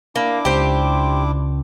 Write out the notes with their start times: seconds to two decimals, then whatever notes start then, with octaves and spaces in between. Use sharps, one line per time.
0.16 A#3 D4 E4 D6
0.45 C#2 G4 C5